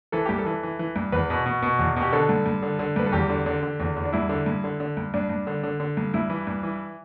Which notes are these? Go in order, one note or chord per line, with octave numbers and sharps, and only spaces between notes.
E3 A4
G2 G4
A4
E3
E3
E3
G2
E2 B4
B2
B2
B2
E2
B2
G4
D3 A4
G2
G2
D3
D3
G2 B4
A4
E2 G4
D3
D3
D3
E2
E2
D4
G2 E4
D3
G2
D3
D3
G2
G2 D4
G2
D3
D3
D3
G2
G2 E4
E3
G2
E3